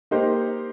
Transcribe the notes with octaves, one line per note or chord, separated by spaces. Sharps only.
A#3 D#4 G4 C5